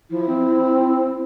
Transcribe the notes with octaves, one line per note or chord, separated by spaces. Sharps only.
F3 E4
C4